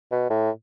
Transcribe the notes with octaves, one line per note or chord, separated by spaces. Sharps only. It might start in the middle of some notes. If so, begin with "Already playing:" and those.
B2
A2